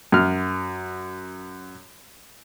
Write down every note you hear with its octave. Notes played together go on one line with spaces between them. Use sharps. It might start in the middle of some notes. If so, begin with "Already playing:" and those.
F#2 F6